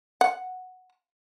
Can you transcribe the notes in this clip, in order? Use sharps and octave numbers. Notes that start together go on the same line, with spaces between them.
F#5